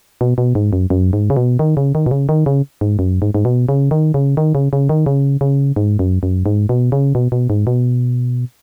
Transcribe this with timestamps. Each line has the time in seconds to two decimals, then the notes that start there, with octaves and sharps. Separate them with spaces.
0.21 B2
0.38 B2
0.55 G#2
0.73 F#2
0.90 F#2
1.13 G#2
1.30 C#3
1.37 B2
1.59 D#3
1.77 C#3
1.95 D#3
2.06 B2
2.11 C#3
2.29 D#3
2.46 C#3
2.81 G#2
2.99 F#2
3.22 G#2
3.35 G#2
3.45 B2
3.69 C#3
3.91 D#3
4.14 C#3
4.37 D#3
4.55 C#3
4.73 C#3
4.89 D#3
5.06 C#3
5.41 C#3
5.76 G#2
5.99 F#2
6.23 F#2
6.46 G#2
6.69 B2
6.92 C#3
7.15 B2
7.32 B2
7.50 G#2
7.67 B2